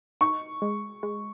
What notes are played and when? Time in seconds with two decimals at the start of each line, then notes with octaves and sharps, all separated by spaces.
0.21 D#4 C#6
0.62 G#3
1.03 G#3